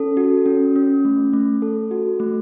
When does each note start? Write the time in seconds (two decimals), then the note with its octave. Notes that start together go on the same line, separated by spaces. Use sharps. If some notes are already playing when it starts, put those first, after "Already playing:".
Already playing: C#4 A4
0.17 F#4
0.46 C#4
0.76 C#4
1.05 A3
1.33 A3
1.62 A4
1.91 F#4
2.20 A3